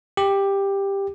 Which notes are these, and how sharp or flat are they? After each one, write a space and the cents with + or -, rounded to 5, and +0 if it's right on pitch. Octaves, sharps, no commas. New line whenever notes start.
G4 +10